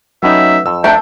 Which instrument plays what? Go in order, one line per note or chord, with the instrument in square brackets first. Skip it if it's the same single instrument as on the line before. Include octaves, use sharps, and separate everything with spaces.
[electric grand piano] F#3 C#4 D#4 [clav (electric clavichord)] A3 B3 G5 [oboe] E5
[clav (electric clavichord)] F2 [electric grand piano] E6
[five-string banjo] A3 D4 [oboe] G5 [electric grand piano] A#5 G6